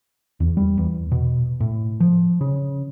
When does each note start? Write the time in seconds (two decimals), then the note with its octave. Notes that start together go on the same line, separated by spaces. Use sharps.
0.40 E2
0.57 G3
0.78 E2
1.12 B2
1.60 A2
2.00 F3
2.41 C#3